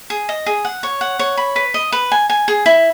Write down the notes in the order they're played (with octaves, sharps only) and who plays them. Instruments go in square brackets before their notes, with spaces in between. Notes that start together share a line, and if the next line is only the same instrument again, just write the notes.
[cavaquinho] G#4
D#5
G#4
F#5
C#5
F#5
C#5
B5
B4
D#5
B4
G#5
G#5
G#4
E4